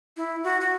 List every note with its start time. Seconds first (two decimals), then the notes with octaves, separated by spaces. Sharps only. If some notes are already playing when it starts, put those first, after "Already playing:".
0.17 E4
0.44 F#4
0.61 F#4